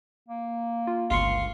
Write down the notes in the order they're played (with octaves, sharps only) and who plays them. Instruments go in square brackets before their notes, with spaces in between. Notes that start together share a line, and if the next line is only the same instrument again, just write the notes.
[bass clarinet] A#3
[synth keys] F4
[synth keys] G1 C#2 [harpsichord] F4 C6 C#6